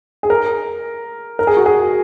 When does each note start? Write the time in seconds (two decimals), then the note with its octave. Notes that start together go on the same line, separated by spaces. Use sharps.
0.23 G#4
0.30 A#4
1.39 A#4
1.47 G#4
1.57 F#4
1.66 G#4